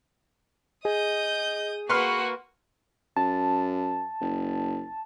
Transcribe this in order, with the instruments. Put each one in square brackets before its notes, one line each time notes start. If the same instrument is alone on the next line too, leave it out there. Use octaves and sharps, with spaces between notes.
[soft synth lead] G#4 [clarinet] D#5 [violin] D#6 G6
[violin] A#3 F#4 [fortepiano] B4 C6 F6 [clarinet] C#6
[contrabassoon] F#2 [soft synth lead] A5
[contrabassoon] F#1